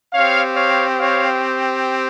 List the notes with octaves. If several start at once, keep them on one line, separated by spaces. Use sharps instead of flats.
C4 G4 C#5 F5
C#5 F5
C#5 F5